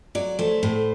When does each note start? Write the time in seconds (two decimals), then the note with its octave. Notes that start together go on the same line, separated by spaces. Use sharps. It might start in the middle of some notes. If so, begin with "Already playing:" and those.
0.15 F#3 D5
0.39 A3 C5
0.63 A2